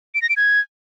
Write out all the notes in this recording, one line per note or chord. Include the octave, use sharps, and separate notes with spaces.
D7
A#6
D7
G#6